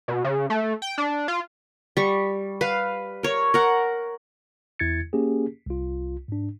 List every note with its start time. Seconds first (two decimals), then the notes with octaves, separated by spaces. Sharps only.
0.08 B2
0.24 C#3
0.50 A3
0.82 G5
0.98 D4
1.28 F4
1.97 G3 C#6
2.61 B4 F5
3.23 A#4 C#5
3.54 A#4 F#5
4.79 E2 E4 G#6 A6 C#7
5.13 A#3 C#4 G4 G#4
5.66 C2 F4
6.28 G#2 D4